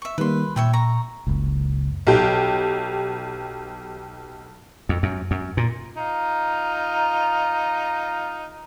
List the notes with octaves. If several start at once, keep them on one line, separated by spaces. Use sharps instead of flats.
E5 C#6
D#3 G3 A#3 B4 C6
A#2 C#5 E5 G5
A#5 C#6
F#1 C#2
B1 G4 G5
F2
F#2
F#2
A#2
D#4 F4 A#5